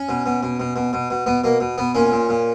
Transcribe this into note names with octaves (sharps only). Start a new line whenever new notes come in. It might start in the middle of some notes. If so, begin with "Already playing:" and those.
Already playing: C#4
B2
B2
B2
B2
B2
B2
B2
B2 B3
B2 A#3
B2
B2 B3
A#2 C#4
A#2
A#2